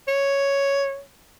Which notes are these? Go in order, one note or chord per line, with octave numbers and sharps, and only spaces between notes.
C#5